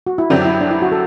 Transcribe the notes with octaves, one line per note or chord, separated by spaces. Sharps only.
F#4
E4
F#2 D3 F#3 C4 D4 G4
E4
D4
E4
F#4
A4